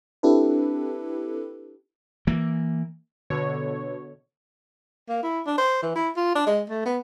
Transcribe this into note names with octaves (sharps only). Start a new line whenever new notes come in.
C4 D4 E4 G4 A4 B4
E3 A#3
B2 D3 C#5
A#3
E4
D4
C5
E3
E4
F4
D4
G#3
A3
B3